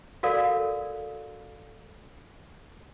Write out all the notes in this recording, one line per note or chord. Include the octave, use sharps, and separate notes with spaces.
F#4 A4 A#4 D5 F5